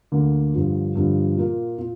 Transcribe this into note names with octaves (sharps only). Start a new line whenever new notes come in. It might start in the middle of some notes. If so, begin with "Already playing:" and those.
D2 D3 A#3
G2 D3 F3
G2 D3 F3
A#2 A#3 F4
A#2